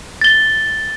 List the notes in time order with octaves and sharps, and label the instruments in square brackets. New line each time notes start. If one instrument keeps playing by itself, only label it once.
[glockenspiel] A6 G7